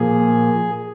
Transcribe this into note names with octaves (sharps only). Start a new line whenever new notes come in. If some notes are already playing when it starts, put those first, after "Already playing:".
Already playing: A#2 F3 A#3 G#4